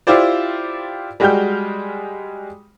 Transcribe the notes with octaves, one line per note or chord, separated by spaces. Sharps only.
E4 F4 G4 C5 D5
G3 G#3 F#4 G5 F6 G6